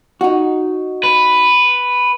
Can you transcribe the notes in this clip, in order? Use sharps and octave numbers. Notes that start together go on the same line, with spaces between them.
D#4 F#4
B4